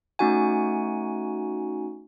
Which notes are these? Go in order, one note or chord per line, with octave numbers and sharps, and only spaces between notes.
A3 C#4 D#4 F#4 F#5 G#5